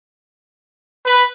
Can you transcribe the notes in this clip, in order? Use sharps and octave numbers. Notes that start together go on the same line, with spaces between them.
B4